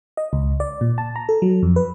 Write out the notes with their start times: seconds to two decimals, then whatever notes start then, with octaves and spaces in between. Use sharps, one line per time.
0.17 D#5
0.33 C#2
0.60 D5
0.81 A#2
0.98 A5
1.16 A#5
1.29 A4
1.42 F#3
1.63 F2
1.76 B4